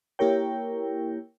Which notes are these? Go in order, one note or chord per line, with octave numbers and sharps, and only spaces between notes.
A#3 E4 G4 A#4 C#5 G5